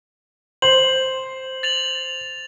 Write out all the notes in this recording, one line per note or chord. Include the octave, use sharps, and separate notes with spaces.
C5 F#7
A6 F7 F#7